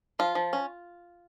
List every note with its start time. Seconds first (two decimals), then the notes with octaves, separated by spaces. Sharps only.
0.19 F3 F4
0.35 F3
0.53 C#4